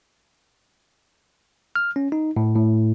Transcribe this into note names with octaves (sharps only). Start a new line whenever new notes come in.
F6
C#4
D#4
A2
A2